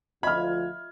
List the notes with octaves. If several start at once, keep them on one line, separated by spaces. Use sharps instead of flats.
D2 F3 F4 D#5 E5 B5 F6 G#6